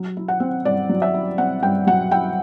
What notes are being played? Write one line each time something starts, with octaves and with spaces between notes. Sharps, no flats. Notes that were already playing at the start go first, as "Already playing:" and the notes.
Already playing: F#3
E4
F#5
C4
G2 D5
F#3
E5
E4
C4 F#5
G2 G5
F#3 F#5
E4 G5